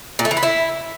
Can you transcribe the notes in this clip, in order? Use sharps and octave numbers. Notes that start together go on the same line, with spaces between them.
A#2
A3
E3
B3
E4